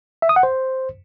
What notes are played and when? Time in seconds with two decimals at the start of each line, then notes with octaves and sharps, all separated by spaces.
0.22 E5
0.29 D#6
0.36 F#5
0.43 C5